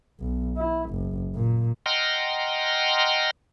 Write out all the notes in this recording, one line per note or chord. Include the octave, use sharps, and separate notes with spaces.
B1
E4
F#1
A#2
D#5 F#5 G5 A#5 C6 F6